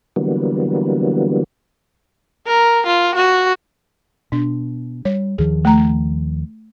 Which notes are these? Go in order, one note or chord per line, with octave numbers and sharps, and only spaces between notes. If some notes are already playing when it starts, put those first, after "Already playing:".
D3 E3 F#3 G3 A#3 B3
A#4
F4
F#4
B2 D4
G3 C#5
D#2 D#3 F3 G#4
A3 A#5